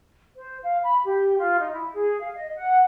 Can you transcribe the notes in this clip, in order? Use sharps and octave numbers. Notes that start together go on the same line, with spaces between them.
C5
F5
B5
G4
F4
D#4
E4
G#4
F5
D#5
F#5